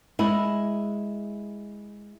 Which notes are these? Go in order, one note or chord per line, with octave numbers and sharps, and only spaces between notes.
G#3 E4